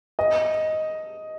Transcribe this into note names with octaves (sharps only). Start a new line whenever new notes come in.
D#5